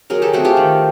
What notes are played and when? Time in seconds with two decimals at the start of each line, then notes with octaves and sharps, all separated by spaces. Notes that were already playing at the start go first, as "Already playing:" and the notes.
0.10 F#3 G#4 A#4
0.22 G4 A4
0.33 A3 C4 F#4 G#4
0.45 F4 G4
0.57 D#3